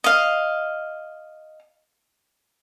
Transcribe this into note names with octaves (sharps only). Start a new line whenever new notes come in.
D#5 F5